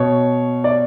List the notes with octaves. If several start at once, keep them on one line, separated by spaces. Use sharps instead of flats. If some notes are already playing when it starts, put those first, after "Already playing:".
Already playing: B2 C#5
D5